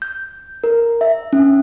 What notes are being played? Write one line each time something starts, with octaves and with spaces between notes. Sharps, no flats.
G6
A#4
E5
C#4